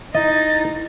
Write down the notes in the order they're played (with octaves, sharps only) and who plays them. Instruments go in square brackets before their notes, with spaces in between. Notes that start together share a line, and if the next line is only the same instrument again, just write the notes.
[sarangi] D#4 [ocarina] E4 [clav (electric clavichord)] D#5 [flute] A6